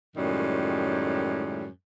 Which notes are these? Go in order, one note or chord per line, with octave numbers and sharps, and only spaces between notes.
F#2 A2 D#3 G3 G#3